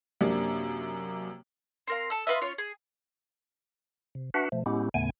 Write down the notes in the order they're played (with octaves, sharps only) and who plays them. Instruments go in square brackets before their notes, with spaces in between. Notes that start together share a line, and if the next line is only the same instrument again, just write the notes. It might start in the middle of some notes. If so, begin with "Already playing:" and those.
[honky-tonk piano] F#2 C3 A#3 D4
[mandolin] C4 A#4 F5
A4 E6
F4 B4 D#5 E5
C#4 F4 C#5
G#4
[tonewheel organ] C3
D4 F#4 B4 E5 F#5
B2 F3 A3
A2 G#3 B3 C#4 E4 G4
D#2 A2 C#3 A3 B3 G#5